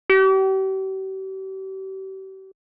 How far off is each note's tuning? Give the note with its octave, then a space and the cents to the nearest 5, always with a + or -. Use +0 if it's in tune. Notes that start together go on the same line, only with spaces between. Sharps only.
G4 -40